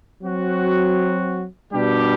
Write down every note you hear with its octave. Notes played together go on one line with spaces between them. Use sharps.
F#3 C4 F#4
B2 G3 D4 G4